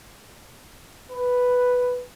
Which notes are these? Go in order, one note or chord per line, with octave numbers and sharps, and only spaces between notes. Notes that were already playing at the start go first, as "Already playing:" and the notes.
B4